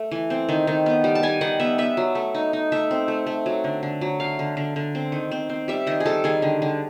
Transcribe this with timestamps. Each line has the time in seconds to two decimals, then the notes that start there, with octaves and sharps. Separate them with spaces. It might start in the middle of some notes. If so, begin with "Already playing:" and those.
Already playing: A3
0.11 E3
0.30 C4
0.49 D#3
0.67 D#3
0.86 B3
1.04 G3
1.15 A5
1.23 G3 G#5
1.41 D#3 F#5
1.60 B3 E5
1.78 B3 E5
1.97 F#3
2.15 A3
2.35 D#4
2.53 D#4
2.72 A3 E5
2.91 C4
3.08 A3
3.27 A3
3.46 F#3
3.64 D3
3.83 D3
4.01 F#3
4.20 A3 F5
4.39 D3
4.57 D3
4.76 D3
4.95 C4
5.12 D#3
5.31 C4
5.49 C4
5.68 G3 E5
5.87 D#3 D#5
6.00 G#4
6.06 G3 A4
6.24 D#3 G#4
6.42 D3
6.62 D3